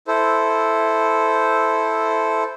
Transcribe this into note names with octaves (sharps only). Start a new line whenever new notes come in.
E4 A4 C5